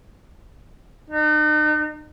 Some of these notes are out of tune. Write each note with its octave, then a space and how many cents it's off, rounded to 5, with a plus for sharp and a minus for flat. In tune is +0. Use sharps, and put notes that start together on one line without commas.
D#4 -40